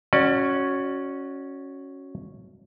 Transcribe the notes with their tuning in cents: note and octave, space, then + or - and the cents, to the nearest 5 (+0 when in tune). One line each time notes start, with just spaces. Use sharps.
C#4 -5 F#4 +0 D5 +30